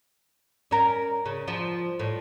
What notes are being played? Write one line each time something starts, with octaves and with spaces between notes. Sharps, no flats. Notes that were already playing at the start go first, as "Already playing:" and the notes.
C#4 A#4
C#3
F3
A2